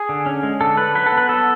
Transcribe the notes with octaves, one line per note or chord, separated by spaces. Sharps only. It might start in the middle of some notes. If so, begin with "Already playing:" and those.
Already playing: G#4
D3
C#4
G#3
D3 A4
D3 B4
F#3 B4
A4
B3
B4
B3 A4